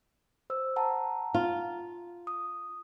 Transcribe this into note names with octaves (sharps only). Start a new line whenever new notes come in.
C5 E6
F#5 A5 A#5
F4
D#6